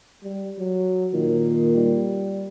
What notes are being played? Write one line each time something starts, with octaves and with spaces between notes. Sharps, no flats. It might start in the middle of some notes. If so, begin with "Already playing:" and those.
G3
F#3
A#2 D#3
G3